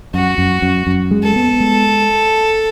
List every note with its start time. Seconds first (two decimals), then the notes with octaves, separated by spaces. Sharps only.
0.14 F#2 F#4
0.38 F#2
0.62 F#2
0.87 F#2
1.11 G#3
1.23 A4
1.36 B3
1.60 G#3